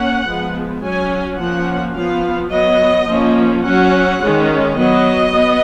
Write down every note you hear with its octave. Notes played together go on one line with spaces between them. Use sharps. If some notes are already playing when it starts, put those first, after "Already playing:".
Already playing: A#3 C#4 F#5
F3 G#3 B3
F#3 C#4 G#5
F3 A#3 C#4 F#5
F3 B3 F5
F#3 B3 D#5
F3 A#3 C#4
F#3 C#4 F#5
D#3 G#3 C#4
F#3 B3 D#5
B3